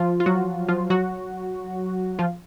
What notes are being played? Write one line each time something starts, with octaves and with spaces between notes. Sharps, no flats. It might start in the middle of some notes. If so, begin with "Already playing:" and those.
Already playing: F3 F4
F4
F#3 F#4
F3 F4
F#3 F#4
F3 F4